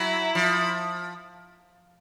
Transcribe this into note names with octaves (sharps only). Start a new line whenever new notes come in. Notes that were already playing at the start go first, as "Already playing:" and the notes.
Already playing: F#3 E4
F3